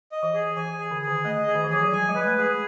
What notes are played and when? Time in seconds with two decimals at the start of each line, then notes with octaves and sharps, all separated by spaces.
0.12 D#5
0.23 E3
0.34 G#4
0.56 E3 G#5
0.80 G#4
0.91 D3
1.02 G#4
1.07 D#3
1.25 A3 D#5
1.47 G#4
1.55 D#3
1.64 E3
1.70 F3 G#4
1.83 F#3
1.93 G3 G#5
2.09 G#3
2.15 B4
2.27 A3
2.38 G#4